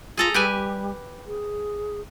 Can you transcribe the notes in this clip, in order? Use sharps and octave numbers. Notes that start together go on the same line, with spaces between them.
F4 G#4 A4 A#5
G3 G4 B4 G#5
G#4